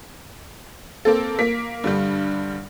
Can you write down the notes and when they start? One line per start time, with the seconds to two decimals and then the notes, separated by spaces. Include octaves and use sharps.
1.05 A#3 C4 A4
1.39 A#3 B6
1.84 G2 D3 G3